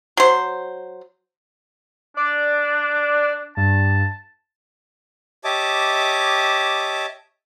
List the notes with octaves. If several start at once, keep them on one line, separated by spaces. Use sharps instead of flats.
F#3 C5
D4 D5
G2 A5
G4 C#5 D#5 E5 A5 D6